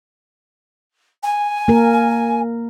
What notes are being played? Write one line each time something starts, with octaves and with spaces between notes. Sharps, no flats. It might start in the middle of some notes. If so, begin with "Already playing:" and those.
G#5
A#3 A#4